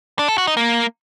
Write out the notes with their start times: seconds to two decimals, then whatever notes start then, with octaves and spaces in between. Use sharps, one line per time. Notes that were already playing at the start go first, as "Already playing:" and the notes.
0.19 D4
0.28 A4
0.38 F#4
0.47 D#4
0.57 A#3